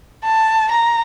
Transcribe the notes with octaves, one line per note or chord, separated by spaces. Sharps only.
A5
A#5